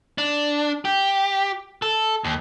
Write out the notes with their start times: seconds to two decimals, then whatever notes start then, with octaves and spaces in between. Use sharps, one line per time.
0.18 D4
0.85 G4
1.82 A4
2.24 D#2